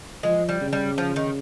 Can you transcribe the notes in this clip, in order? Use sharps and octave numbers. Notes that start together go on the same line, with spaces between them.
F3 G#3
G3
C#3
G3
F3
D#3